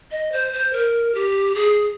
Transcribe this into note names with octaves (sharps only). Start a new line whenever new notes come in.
D#5
C5
C5
A#4
G4
G#4